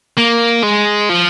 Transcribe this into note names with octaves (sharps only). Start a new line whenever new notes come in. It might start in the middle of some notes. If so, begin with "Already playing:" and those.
A#3
G#3
F3